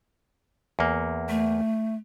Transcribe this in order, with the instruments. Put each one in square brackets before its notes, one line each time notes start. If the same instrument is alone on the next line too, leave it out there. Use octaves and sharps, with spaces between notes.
[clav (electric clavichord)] E2 A#3
[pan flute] A3